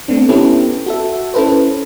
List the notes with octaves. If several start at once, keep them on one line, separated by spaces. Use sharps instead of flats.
A3 B3 C4 D4
B3 C#4 E4 G4 A4 B4
F#4 A4 E5
C#4 E4 A4 B4 C5